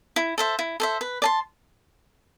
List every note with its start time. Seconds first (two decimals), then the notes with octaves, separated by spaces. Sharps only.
0.16 E4
0.38 A4 C5 E5
0.59 E4
0.80 A4 C5 E5
1.01 B4
1.22 D5 A5 C6